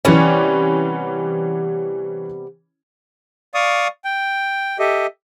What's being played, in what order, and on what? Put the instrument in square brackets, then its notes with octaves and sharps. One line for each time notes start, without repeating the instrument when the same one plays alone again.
[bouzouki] C3 G3 B3 [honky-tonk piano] E3 C#4
[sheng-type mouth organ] D5 F5 C#6 D#6
G5
G4 A4 D#5 E5